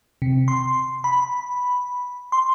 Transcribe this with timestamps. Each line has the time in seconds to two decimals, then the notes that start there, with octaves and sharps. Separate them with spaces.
0.22 C3
0.48 C6
1.04 B5
2.32 C6